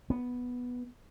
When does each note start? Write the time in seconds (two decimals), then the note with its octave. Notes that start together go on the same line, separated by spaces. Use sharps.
0.10 B3